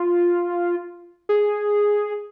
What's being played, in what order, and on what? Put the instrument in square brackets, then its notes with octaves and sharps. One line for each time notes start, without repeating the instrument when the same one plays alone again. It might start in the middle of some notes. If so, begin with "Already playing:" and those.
Already playing: [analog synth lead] F4
G#4